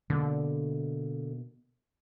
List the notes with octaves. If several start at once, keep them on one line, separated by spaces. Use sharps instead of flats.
B2 D3 A#3